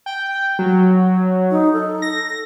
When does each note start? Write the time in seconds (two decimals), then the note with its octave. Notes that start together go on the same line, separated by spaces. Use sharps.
0.06 G5
0.59 F#3
1.51 D#4
1.73 A4
2.02 A#6